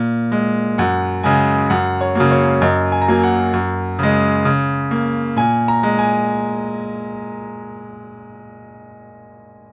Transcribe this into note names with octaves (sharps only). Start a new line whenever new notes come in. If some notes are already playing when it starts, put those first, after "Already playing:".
Already playing: A#2
G#3
F#2 F#5
C#3 G#3 G#5
F#2 F#5
C#5
C#3 F#3 A#3
C#5
F#2 D#5
G#5
A#5
F#3 A#3 G#5
F#5
F#2
C#3 G#3
C#3
A#3
A#2 G#5
A#5
G#3
G#5